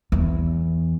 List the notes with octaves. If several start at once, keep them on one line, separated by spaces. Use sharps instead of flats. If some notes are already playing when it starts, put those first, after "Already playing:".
E2